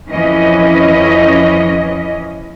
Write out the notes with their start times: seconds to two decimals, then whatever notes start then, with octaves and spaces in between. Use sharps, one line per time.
0.11 F2 E3 C#4 D#5